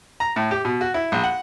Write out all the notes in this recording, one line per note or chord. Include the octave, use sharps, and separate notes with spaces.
A#5
A2
G4
B2
F#4
E4
A#1
F#5